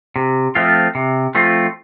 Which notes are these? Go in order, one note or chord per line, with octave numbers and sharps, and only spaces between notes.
C3
F3 A3 C4 F4
C3
F3 A3 C4 F4